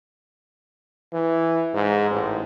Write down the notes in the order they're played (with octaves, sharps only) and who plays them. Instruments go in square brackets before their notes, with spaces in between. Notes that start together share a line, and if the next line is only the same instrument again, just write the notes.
[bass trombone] E3
G#2
A1